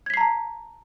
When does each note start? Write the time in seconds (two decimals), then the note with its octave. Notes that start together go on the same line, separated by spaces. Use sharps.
0.06 G#6
0.10 B6
0.14 C7
0.17 A#5
0.21 A5